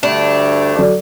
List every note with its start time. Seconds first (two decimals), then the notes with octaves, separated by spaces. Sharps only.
0.03 D2 G2 A3 D4
0.75 F#3 A4 D5